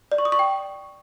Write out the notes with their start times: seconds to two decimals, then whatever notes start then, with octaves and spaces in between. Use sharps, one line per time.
0.12 D5
0.18 C#6
0.25 D#6
0.32 C#6
0.39 G5